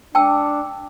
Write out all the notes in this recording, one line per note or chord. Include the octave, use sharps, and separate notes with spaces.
D4 G5 A5 E6